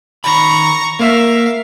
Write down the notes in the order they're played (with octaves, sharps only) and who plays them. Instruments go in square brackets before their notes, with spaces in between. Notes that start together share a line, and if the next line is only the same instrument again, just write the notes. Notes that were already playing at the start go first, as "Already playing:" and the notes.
[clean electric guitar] D#3 B5 [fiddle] A#5 C#6
[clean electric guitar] A#3 [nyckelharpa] A#4 E5 [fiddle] F5